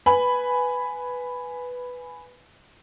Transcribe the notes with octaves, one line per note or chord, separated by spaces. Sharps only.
B4 G#5 B5